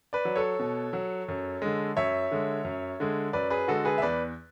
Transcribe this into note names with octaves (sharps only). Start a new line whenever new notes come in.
B4 D5
F#3
A4 C#5
B2
F#3
F#2
D3 G#3
F#2 C#5 E5
D3 G#3
F#2
D3 G#3
F#2 B4 D5
G#4 B4
D3 G#3 F#4 A4
G#4 B4
E5
E2 B4 D5